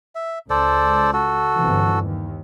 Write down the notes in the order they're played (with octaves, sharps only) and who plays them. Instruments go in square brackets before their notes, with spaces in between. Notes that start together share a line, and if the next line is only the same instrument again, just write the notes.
[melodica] E5
[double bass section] C#2 [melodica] A4 C5 D5
[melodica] F#4 A4
[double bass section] G1 C3 E3
D#2